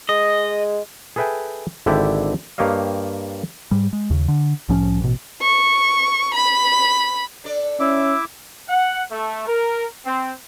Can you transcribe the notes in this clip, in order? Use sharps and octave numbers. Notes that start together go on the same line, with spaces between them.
G#3 D#5
G#4 A4 B4 E5 G5 G#5
G#1 D3 E4 G4 D5 G5
G2 A#3 G4 C#5 D#5 F5
G#2 G3
G#3
D#2 C#3
D3
C2 A2 F3 C#4
A1 B2
C#6
B5
D4 A4 D5
C#4 E4 E5 D6
F#5
A3
A#4
C4